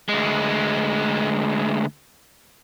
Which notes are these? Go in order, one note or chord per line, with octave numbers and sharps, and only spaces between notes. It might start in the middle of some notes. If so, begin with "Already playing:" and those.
D2 G#3